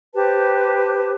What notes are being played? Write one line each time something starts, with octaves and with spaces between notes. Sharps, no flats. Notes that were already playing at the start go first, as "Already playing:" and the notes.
G4 B4 C5 A5